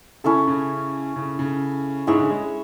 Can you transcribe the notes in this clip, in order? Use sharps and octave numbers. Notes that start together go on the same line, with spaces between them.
C#3 C#4 E4 A4
C#3
C#3
C#3
G#2 E4 G#4 C#5 E5
D3
G#3